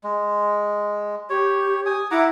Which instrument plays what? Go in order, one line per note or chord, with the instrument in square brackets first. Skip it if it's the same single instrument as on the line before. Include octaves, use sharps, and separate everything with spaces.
[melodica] G#3
[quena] G4 [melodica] C#5
[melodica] G#5 D#6
[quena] E4 [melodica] F#5 A#5 D6